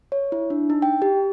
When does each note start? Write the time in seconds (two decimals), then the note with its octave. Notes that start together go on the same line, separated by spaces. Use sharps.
0.12 C#5
0.32 E4
0.50 D4
0.70 D#4
0.82 G5
1.02 G4